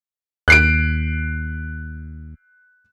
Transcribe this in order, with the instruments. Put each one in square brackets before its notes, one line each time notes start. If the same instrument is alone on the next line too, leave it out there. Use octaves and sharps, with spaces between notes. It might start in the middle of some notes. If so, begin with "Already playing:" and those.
[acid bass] D#2 [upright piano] F#6 C7 D7